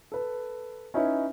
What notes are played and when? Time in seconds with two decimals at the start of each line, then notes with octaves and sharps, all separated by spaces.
0.12 A4 B4
0.94 C#4 D#4 E4 B4 C#5